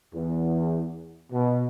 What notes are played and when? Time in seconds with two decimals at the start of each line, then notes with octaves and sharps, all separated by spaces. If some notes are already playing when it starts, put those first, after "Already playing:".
0.14 E2
1.32 B2